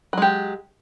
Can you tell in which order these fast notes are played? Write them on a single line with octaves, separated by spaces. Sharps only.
F#3 G#3 G4